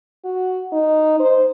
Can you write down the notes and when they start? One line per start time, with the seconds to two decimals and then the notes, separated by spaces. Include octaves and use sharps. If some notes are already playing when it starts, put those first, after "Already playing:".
0.24 F#4
0.72 D#4
1.19 C5